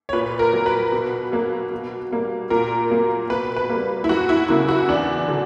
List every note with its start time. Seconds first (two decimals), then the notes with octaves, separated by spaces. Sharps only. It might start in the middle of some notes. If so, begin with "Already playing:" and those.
0.09 C#5
0.13 A#2 B4
0.39 A#4
0.53 F#3 A#3
0.66 B4
0.92 B2
1.32 F#3 A#3
1.72 B2
2.12 G3 A#3
2.50 A#2 A#4
2.90 F#3 A#3
3.30 B2 B4
3.56 B4
3.69 G3 A#3
4.04 E4
4.09 F#2 F#4
4.29 E4
4.48 C#3 F#3 A#3 E4
4.68 F#4
4.89 E2 D4
5.28 D3 F#3